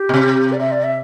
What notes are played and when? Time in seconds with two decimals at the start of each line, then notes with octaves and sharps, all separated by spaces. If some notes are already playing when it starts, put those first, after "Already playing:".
Already playing: G4
0.09 B2
0.14 C3
0.52 D5
0.60 E5
0.72 D5
0.84 E5